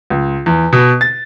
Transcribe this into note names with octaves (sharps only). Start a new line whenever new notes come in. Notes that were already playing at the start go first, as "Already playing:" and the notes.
C#2
E2
B2
A6